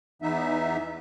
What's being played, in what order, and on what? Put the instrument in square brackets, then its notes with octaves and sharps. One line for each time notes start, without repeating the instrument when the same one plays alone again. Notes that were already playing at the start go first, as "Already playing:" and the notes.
[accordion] E2 E3 B3 D#4 E5